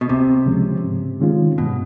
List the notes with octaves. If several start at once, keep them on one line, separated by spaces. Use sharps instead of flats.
B2
C#2 C3
C#3 F3 G#3 C#4
G#2
D#3 G#3 C#4 F4
G2 B2